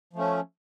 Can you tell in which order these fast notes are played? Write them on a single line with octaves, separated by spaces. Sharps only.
F3 A3 C#4